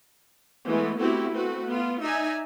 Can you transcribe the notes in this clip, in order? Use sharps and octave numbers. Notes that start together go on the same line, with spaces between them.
E3 G#3 A3 B3
A3 B3 C4 E4 F#4 G4
A3 C4 F#4 B4
B3 F4
D#4 D5 E5 G#5 A#5